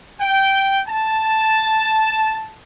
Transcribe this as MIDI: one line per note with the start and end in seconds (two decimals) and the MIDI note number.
0.20 0.79 79
0.88 2.57 81